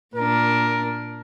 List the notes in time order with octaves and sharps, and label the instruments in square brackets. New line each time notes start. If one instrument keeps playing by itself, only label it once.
[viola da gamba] A#2 D4 [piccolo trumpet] A#4